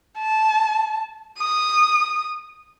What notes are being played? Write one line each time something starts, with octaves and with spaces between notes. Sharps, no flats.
A5
D#6